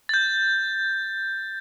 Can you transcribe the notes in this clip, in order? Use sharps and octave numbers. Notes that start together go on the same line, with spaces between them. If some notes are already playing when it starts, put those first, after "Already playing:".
G6 A6